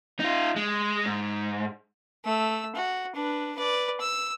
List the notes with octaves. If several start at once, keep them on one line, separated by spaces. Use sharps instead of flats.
D#4 F4
G#3
G#2
A3 E6
F#4
D4 B4
B4 D5
E6